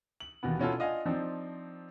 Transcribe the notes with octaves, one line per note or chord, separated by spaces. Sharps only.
F#7
D#2 B2 E3 B3
B2 B3 C#4 E4 F4 A4
D4 F4 D#5 F5 F#5 G#5
F3 C4 D4 D#4